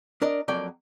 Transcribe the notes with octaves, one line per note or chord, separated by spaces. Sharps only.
D4 A#4 D5 D#5
F2 F#3 A#3 D5 G5